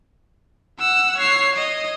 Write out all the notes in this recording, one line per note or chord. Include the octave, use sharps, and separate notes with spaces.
F#5 E6
C#5 C7
D#5